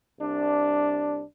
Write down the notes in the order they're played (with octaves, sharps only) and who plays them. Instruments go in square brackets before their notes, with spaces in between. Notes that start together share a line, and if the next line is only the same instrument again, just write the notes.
[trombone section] C2 D4